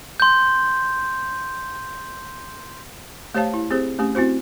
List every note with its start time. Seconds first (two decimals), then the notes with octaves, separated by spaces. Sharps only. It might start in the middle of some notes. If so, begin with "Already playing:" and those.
0.20 C6 G6
3.35 A3 G4 C5 C#5 F5 A5
3.54 E4
3.71 C4 G4 G#4 C5
3.99 A3 C#4 G4
4.15 C4 E4 F#4 C5